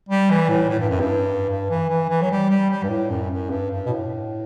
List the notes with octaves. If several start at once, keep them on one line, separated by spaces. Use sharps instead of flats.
G3
E3
A2
A2
G2
F#2
G2
G2
E3
E3
E3
F#3
G3
G3
G3
G2
A2
F#2
F#2
G2
G2
B2
A2